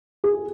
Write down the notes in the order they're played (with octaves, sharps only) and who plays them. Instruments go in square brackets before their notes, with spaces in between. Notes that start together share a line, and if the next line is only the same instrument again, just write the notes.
[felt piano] G#4